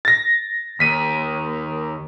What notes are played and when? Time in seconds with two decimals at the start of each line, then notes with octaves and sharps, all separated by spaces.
0.05 A6 A#6
0.80 D#2 B6 D#7